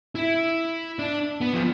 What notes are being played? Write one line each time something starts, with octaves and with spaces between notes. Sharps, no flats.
E4
D4
B3
F3